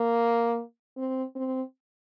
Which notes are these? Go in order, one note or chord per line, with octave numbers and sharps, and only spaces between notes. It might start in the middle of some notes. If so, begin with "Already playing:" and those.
Already playing: A#3
C4
C4